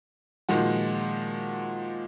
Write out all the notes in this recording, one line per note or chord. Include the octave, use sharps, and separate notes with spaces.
A#2 D#3 F3 G#3 F#4